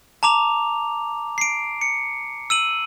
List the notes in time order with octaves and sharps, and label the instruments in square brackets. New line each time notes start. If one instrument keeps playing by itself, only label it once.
[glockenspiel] A5 A#5 D6 F7
C7 D7
C#7
E6 D#7 F#7